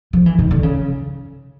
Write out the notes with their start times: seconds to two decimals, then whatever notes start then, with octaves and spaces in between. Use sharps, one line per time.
0.13 F3
0.26 E3
0.39 D#3
0.51 D3
0.63 C#3